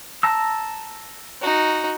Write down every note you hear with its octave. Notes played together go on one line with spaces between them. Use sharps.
A5 A#5 E6
D#4 F#4